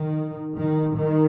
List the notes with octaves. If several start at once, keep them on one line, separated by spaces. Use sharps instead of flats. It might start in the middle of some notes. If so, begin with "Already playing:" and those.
Already playing: D#3
D#3
D#3